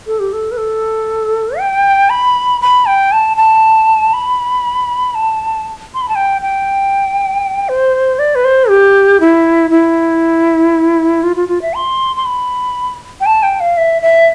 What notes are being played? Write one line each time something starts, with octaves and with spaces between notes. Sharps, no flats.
A4
G4
A4
B4
A4
G5
B5
B5
G5
A5
A5
B5
A5
C6
B5
A5
G5
G5
C5
D5
B4
C5
G4
E4
E4
F4
F4
F4
E5
C6
C6
B5
G5
A5
G5
F5
E5
E5